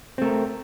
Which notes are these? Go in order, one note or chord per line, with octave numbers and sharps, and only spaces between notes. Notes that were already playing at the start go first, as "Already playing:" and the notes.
A3 C4 A#4